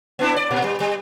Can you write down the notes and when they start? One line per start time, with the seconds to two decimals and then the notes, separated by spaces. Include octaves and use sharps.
0.19 B3 D4 E4
0.36 D5
0.51 A#2
0.64 G3
0.80 G3